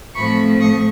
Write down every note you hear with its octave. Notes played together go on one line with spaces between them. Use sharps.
A2 F3 A3 C4 B5 C#6
C#6 D#6